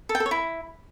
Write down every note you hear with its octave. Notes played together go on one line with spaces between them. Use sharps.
A4
G5
A4
C#5
E4